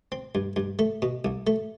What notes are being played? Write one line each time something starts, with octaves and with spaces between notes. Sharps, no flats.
C4
G2
G2
A3
B2
C2
A3